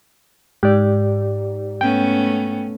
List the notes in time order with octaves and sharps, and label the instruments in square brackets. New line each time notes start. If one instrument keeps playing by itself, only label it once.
[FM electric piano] G#2 [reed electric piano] G4 D5
[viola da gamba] A3 B3 C#4 [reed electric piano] G5